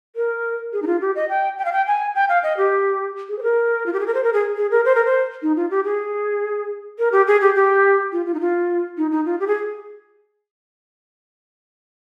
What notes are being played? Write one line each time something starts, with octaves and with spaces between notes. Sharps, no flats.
A#4
G#4
D#4
F4
G4
D#5
G5
G5
F5
G5
G#5
G5
F5
D#5
G4
G#4
C5
A#4
F4
G4
G#4
A#4
C5
A#4
G#4
G#4
A#4
C5
A#4
C5
D#4
F4
G4
G#4
A#4
G4
G#4
G4
G4
F4
F4
D#4
F4
D#4
D#4
F4
G4
G#4